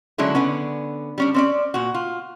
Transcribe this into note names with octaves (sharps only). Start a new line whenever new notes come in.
D3 F#3 G#3 C#4 D4 E4
D3 B3 C#4
G3 C#4 D4
C4 C#4 D5
A#2 F#4
F4